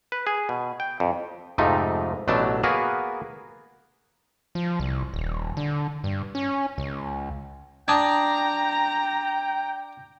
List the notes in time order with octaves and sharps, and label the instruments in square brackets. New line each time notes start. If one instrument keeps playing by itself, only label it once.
[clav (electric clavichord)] B4
G#4
B2
G5
F2
F2 G#2 C3 F3 A3 D#4
A1 B2 F#3 A3 D4 A5
A#3 B3 F#4 G#4 A#4 B4
[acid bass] F3
C2
D#1
D3
G2
C#4
C#2
[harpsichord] D4 [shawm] G5 [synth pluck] A5 D#6 G#6 [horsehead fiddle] A#5